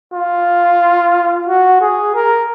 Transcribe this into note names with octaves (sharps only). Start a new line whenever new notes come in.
F4
F#4
G#4
A#4